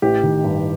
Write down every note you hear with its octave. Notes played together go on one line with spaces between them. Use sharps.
A1 G4
D#3
G2